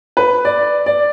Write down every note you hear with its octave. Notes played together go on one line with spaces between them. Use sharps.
B4
D5
D5